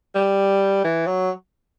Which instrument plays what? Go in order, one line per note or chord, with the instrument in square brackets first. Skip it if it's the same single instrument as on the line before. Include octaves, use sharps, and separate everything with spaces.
[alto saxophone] G3
E3
F#3